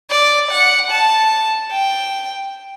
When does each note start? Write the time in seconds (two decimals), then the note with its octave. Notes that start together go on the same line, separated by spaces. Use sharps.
0.10 D5
0.51 F#5
0.91 A5
1.71 G5